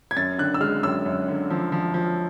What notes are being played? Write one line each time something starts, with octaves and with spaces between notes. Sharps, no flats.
G#6
F#2 A6
D3 F#6
E6
G#3 F6
F#2 E6
F#2
D3
F3
F3
F3